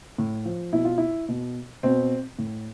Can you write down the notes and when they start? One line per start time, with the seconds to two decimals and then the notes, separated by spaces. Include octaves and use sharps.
0.18 A2
0.45 F3
0.73 B2 E4
0.85 F4
0.98 E4
1.29 B2
1.83 B2 C4
2.39 A2